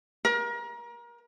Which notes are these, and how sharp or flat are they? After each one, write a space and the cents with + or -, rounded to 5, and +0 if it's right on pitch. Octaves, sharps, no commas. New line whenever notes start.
A#4 +30